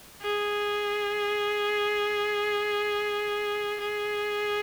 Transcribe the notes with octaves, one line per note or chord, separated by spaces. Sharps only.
G#4
G#4